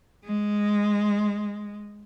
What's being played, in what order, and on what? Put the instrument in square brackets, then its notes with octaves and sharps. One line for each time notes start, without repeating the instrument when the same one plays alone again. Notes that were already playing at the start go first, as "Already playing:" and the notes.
[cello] G#3